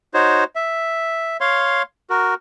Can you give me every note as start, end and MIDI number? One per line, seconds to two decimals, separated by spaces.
0.14 0.44 63
0.14 0.44 66
0.14 0.44 72
0.14 0.44 73
0.55 1.37 76
1.41 1.82 73
1.41 1.82 77
1.41 1.82 84
2.10 2.34 66
2.10 2.34 70